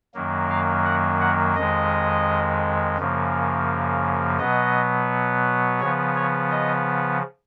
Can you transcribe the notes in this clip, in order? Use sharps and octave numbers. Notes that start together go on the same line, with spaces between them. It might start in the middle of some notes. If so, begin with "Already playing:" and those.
F#2 D#3 F#3 A#3
F5
F#5
F#5
F2 D#3 G#3 D#5
F#2 C#3 F3 A#3
B2 F#3 B3 D#5
C#3 F3 B3 C#5
C#5
D#5